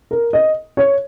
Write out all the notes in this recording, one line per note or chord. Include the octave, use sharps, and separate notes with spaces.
A#4
D#5
C#5